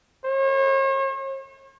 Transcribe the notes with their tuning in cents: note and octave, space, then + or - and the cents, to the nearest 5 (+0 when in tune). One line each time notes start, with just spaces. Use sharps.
C#5 -45